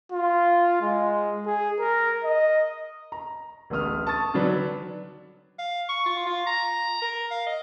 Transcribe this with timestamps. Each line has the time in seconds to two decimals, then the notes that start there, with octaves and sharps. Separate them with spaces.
0.12 F4
0.82 G#3
1.46 G#4
1.79 A#4
2.24 D#5
3.12 A#5
3.70 D1 A1 A3 D#6 F6
4.07 A5 C#6 D#6 A6
4.34 D3 D#3 F#3 D4 B4
5.59 F5
5.89 C#6
6.06 F4
6.27 F4
6.47 A#5
7.02 A#4
7.31 F5
7.47 D#5